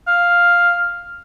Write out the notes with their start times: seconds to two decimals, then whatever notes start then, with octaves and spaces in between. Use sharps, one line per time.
0.08 F5